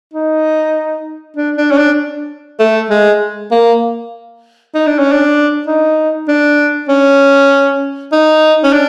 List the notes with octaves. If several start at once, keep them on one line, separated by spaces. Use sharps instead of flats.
D#4
D4
D4
C#4
D4
A3
G#3
A#3
D#4
D4
C#4
D4
D#4
D4
C#4
D#4
C#4
D4